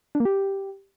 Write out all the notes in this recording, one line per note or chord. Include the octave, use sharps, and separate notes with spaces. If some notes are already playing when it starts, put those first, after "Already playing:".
D4
A#3
G4